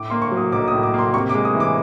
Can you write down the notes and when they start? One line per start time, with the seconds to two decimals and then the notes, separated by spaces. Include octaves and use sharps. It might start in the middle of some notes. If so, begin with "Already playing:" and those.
Already playing: A2 D6
0.10 A#3 C6
0.22 C#6
0.32 F#3
0.37 D#6
0.52 B1 D6
0.68 D#6
0.73 A2
0.83 D6
0.94 A#3 C6
1.14 C3 C#6
1.29 G#3 D6
1.45 D#6
1.55 E3
1.60 D6